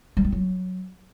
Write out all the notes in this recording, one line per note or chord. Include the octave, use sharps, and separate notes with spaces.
G3
C4
F#3